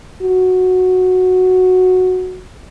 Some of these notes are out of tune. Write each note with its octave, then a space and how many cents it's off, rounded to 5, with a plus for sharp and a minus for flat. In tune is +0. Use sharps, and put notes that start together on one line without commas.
F#4 -5